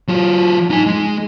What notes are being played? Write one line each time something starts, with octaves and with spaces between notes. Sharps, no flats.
F#3 F4
D#4 G#5
G#3 G#4